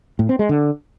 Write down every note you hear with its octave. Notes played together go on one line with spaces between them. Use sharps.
A2
C4
G#3
D3